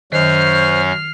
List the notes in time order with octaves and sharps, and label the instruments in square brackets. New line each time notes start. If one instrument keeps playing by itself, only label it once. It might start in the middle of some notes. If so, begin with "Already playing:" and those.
[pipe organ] F#2 C#4 [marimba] D#3 [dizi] C5 [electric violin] F6 C7